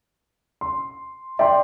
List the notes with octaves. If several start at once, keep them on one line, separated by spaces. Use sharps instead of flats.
C6
D5 E5 G5 C6